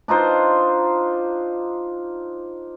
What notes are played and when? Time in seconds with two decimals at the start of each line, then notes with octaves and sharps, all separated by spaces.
0.08 D4 D#4 F4 C5